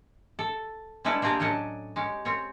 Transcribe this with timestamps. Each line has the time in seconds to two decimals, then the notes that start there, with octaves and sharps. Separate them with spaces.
0.39 A4
1.05 G3 G#3 B3 D4 E4 G4
1.22 A#3 C4 D4 G4 G#4 A#4
1.40 A2 F#3 C#4 D4 D#5
1.96 G#3 C#4 G4
2.25 C4 C#4 C#5